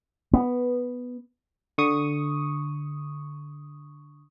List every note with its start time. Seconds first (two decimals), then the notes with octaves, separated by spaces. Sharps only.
0.33 B3
1.78 D3 C#6 D#6